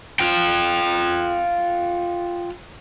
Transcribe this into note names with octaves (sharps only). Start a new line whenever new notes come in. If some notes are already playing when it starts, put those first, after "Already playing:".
F4 G5